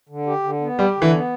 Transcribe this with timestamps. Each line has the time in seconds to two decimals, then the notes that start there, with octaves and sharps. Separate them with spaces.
0.09 D3
0.26 G4
0.43 D3
0.61 B3
0.78 G3 G4
0.96 D3
1.02 E3
1.13 B3